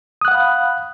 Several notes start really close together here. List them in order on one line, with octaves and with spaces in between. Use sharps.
D#6 F#6 F#5 F5 B5